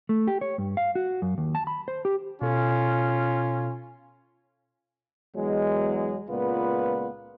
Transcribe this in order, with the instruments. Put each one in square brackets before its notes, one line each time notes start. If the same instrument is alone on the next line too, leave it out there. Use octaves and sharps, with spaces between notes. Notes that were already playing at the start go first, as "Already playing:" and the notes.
[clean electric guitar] A3
G4
C#5
G2
F5
F#4
F#2
D#2
A5
B5
C5
G4
[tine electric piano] B2 A4 [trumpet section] C#4 F4
[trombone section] E2 F#3 G#3
C#2 A#2 B3 F4 B4